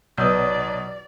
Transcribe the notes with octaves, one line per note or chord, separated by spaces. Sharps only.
B1 B2 B4 D5 D#5 D#6 E6 G6